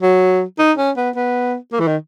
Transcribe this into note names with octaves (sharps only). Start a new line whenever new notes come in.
F#3
D#4
C#4
B3
B3
A#3
E3
D#3